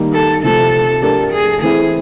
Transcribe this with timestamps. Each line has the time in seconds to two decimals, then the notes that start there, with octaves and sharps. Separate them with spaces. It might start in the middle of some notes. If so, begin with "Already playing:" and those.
Already playing: D#3 G3 A#3 D#4
0.13 A4
0.43 C3 F3 A3 A4
1.02 A3 D4 G4 A4 A#4
1.32 G#4
1.62 E3 A3 C4 E4 G#4